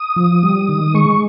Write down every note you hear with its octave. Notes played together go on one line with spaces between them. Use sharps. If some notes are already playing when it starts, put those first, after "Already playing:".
Already playing: D#6
F3
G3
D#3
G#3 C#6